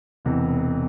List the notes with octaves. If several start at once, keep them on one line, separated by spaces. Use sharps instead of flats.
E1 E2 C3